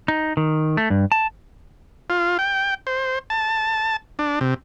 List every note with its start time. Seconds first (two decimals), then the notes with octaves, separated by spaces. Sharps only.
0.08 D#4
0.37 D#3
0.77 A3
0.90 G2
1.12 A5
2.10 F4
2.39 G5
2.87 C5
3.30 A5
4.19 D4
4.41 C3